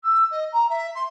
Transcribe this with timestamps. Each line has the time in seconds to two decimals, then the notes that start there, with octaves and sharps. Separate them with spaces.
0.04 E6
0.31 D#5
0.52 A#5
0.69 E5
0.95 C6